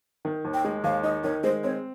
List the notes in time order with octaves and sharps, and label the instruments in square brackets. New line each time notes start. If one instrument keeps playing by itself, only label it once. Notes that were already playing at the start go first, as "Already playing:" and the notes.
[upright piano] D#3
D#2
[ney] G5
[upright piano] G#3
[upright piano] D#2 [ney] F5
[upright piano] D#4 [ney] D#5
[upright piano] D#3 [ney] C#5
[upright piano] G#3 [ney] C5
[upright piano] C4 [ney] C#5